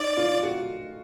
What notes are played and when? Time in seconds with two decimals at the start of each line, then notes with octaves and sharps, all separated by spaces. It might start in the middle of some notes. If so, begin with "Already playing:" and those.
Already playing: D#4 D5
0.17 F4
0.43 F#4